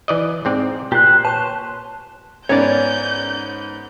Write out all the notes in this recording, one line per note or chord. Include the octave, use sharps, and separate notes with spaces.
E3 D5 D#5
G#2 C4 D5
A#2 G4 C5 F#6
B4 C#5 A5 C6
G#2 B3 C#4 A#4 C#5 D5 G6